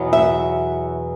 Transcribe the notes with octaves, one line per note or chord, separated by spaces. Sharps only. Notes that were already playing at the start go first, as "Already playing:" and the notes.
Already playing: E2 B2 F#3 B3
E5